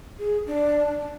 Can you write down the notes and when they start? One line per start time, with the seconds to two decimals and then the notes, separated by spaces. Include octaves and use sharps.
0.19 G#4
0.47 D4